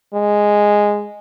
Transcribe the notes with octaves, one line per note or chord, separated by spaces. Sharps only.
G#3